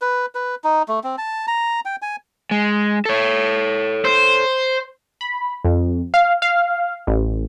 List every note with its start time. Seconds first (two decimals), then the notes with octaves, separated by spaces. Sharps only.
0.01 B4
0.35 B4
0.64 D#4
0.88 A3
1.04 C4
1.18 A5
1.48 A#5
1.85 G5
2.02 G#5
2.51 G#3
3.05 A4 C#5
4.05 C5
5.21 B5
5.65 F2
6.14 F5
6.42 F5
7.07 A1